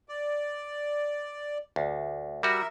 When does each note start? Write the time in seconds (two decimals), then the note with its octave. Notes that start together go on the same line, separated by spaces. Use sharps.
0.09 D5
1.76 D2
2.43 G3 F#4 A#4 E5